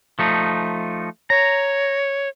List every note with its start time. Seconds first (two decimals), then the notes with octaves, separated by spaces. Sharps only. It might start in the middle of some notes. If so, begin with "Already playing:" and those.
0.19 F3 A3 D#4
1.30 C#5 A#5